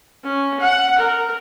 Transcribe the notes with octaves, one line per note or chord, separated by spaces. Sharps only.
C#4
F#5
A#4